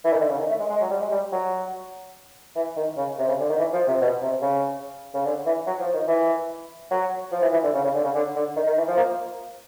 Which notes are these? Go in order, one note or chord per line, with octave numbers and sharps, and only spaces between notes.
E3
D#3
D3
C#3
D#3
A3
G#3
G#3
F#3
G3
G#3
G3
F#3
E3
D#3
C#3
C3
C#3
D3
D#3
E3
F3
C3
B2
C3
C#3
C#3
D3
E3
F#3
F3
D#3
E3
F#3
F3
E3
E3
D3
C#3
C#3
D3
C#3
D3
D3
D#3
D#3
E3
F3
A#3